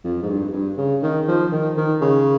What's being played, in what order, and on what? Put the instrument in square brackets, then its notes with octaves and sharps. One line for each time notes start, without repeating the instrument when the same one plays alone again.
[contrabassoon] F2
G#2
G2
G2
C#3
D#3
F3
D#3
D#3
C#3